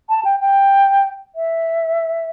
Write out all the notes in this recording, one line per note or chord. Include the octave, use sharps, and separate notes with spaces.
A5
G5
G5
E5